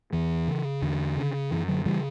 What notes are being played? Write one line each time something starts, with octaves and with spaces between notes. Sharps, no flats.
E2 E3
C#3
E2 D3
C#3
F#2 E3
D3 F#3
C#3 E3 G3